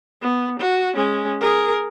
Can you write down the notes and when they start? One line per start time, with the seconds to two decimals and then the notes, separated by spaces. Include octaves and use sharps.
0.22 B3
0.59 F#4
0.95 G#3 C#4
1.40 G#4 A#4